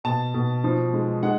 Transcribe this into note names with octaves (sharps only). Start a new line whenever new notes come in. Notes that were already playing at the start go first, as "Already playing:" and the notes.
B2 A5
B2
F3
G#3
G#3 F#5